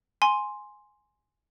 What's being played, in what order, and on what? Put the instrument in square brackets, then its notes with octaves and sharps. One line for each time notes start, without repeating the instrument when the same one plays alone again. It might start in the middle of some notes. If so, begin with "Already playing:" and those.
[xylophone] G#5 C6